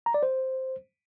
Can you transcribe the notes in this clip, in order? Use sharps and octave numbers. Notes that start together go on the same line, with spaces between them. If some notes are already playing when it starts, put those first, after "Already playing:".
A#5
D5
C5